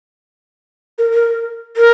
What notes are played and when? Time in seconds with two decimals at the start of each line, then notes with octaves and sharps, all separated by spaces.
0.98 A#4
1.14 A#4
1.77 A#4